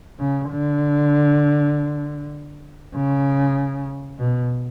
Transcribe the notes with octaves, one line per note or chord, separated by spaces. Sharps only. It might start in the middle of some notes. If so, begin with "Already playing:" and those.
C#3
D3
C#3
B2